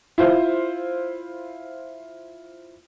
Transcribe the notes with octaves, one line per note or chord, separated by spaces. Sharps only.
E4 F4 C5